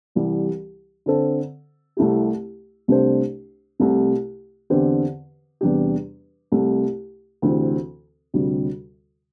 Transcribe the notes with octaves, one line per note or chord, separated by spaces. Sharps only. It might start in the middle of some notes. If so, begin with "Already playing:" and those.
C2 C3 E3 G3
D3 C4 A4 C5
C2 C3 A3 E4 G4
C2 C3 A3 D4 C5
C2 C3 A3
E2 D3 C4 G4 C5
E2 C3 G3 D4 G4
C2 C3 A3
D2 C3 E3 C4
D2 C3 G3